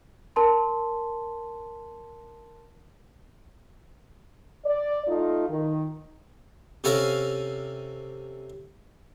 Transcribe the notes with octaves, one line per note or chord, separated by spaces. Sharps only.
A#4 A5 C6
D5
A3 D#4 F4
D#3
C3 C#4 A4 F5 G#5 A#5